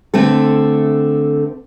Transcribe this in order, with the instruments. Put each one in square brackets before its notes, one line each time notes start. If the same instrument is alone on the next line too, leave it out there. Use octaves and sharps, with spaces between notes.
[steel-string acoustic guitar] D3 A3 C4 A4